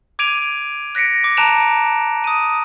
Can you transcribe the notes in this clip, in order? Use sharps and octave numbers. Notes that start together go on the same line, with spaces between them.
D6 G#6 D7 D#7 F7
F#6 A#6 B6 C#7 D7
D6
A5 A#5 F#6 D7 E7 F7
D#6 D#7